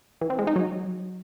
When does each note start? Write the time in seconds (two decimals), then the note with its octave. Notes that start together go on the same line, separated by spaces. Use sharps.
0.21 E3
0.30 C4
0.39 G#3
0.47 D#4
0.56 F#3